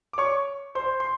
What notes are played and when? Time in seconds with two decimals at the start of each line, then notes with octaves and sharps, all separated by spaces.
0.13 D6
0.18 C#5 C#6
0.75 C5 C6
1.00 C6